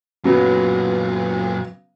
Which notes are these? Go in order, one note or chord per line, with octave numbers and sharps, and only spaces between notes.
F#2 A#2 C#3 F#3 B3